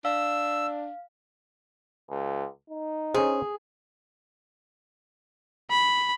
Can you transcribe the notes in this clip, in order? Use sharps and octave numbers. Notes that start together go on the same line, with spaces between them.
D4 F5 E6
C#2
D#4
C#4 G#4 C5
B5